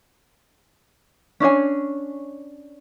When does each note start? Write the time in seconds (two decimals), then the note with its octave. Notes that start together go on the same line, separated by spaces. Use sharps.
1.40 C#4 D4 C#5 G#5